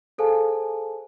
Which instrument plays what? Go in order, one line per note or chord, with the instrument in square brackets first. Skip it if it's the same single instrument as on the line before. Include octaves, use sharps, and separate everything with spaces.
[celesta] G#4 A4 C5 F5 G#5 A5